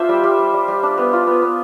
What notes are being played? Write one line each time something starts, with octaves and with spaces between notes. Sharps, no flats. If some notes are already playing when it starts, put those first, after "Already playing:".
Already playing: D4 F4 C5 E5
G3
G3
G3
G3
G3
D4
B3
F4
B3
B3